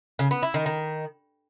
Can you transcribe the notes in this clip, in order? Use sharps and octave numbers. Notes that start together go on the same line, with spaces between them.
C#3
B3
E4
D#3
D#3